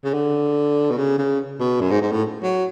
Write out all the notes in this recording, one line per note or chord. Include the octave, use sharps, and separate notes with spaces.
C#3
D3
B2
C#3
C#3
B2
F#2
G#2
G#2
A2
F#3